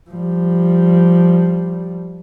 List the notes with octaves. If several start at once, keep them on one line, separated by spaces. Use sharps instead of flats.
F3 G3